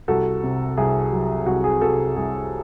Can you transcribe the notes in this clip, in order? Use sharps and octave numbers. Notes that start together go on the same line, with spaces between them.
C2 F#4 A4
C3
C2 G#4
F#3
C2 F#4
G#4
C3 F#4 A4
C2 G#4